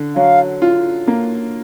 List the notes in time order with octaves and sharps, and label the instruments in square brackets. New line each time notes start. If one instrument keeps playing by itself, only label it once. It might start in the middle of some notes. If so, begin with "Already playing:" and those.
Already playing: [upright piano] D3
[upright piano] F#3 [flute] F5
[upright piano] F4
A#3